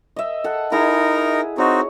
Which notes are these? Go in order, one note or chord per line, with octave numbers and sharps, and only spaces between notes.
D#5 E5
A4 F#5
D#4 E4 G#4 A#4 A#5
C4 D#4 F#4 C#5